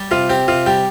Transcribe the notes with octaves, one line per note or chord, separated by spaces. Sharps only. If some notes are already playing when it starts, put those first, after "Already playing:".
Already playing: G3
C3 F4
C4 G4
C3 F4
G3 G4